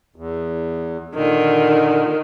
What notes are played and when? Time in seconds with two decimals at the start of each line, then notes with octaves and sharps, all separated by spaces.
0.16 E2
1.15 A#2 D3 D#3